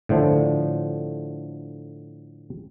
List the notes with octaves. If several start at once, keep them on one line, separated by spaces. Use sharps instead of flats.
A2 D3 F3